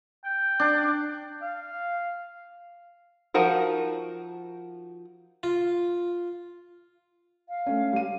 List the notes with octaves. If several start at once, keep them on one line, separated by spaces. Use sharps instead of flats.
G5
D4
F5
F3 D#4 F#4 A#4 C5
F4
F5
A3 C#4
G3 D#7